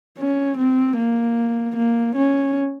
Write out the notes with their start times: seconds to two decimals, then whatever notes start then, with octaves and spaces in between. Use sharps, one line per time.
0.18 C#4
0.57 C4
0.97 A#3
1.76 A#3
2.15 C#4